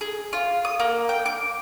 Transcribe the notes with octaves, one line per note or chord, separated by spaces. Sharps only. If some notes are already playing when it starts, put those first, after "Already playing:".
G#4
F4
D#6
A#3
G5
D6